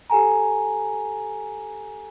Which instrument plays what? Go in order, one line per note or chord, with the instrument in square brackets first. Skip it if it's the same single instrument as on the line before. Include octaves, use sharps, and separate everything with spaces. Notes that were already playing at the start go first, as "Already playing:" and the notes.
[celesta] G4 A4 G#5 A#5